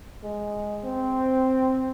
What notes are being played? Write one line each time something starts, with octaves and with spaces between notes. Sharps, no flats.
G#3
C4